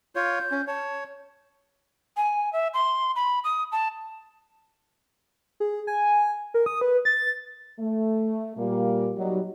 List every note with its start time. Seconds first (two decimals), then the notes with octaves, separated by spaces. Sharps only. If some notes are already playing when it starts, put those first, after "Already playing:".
0.16 F4 C#5 G6
0.51 C#4
0.67 C#5 A5
2.17 G#5
2.53 E5
2.74 C6
3.16 B5
3.44 D#6
3.72 A5
5.60 G#4
5.87 G#5
6.54 A#4
6.66 D#6
6.81 B4
7.05 A6
7.79 A3
8.57 A#2 G3 A#3
9.17 F#3 G3 D#4